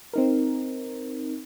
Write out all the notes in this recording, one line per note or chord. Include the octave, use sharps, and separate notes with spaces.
C4 D#4 A#4